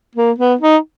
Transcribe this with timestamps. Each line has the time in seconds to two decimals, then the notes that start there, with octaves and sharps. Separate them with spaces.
0.16 A#3
0.38 B3
0.61 D#4